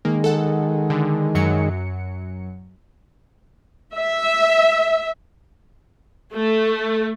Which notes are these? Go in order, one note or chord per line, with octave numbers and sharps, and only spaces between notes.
D#3 G#3 A#3
A4 F#5
D3
F#2 F#3 C#7
E5
A3